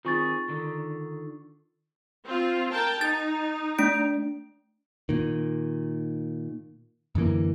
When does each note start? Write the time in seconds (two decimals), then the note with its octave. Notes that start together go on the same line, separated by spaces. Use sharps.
0.05 D#3 C4 F4 G#4 C#6 A6
0.48 D3 D#3 D4
2.25 C4 F4
2.71 A#4 G5 A5
3.01 D#4 A6
3.79 A3 D4 D7
5.09 A#2 D#3
7.15 F#2 D3 E3 A#3